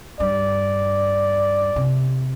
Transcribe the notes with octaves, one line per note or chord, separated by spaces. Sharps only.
G2 D5
C3